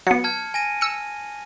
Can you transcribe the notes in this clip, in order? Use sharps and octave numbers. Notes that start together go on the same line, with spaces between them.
F#3 B3 C#7
A5 F6 G#6
G#5 A#6 D#7
E6 C#7